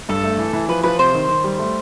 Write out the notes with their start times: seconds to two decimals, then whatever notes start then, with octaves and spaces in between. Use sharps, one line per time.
0.09 G2 A4
0.23 A3
0.38 E3
0.53 E3
0.69 F3 B4
0.83 F3 B4
0.99 C3 C5
1.14 D#3
1.29 D#3
1.44 G3
1.59 A3